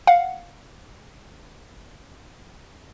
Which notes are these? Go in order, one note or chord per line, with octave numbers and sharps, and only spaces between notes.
F5 F#5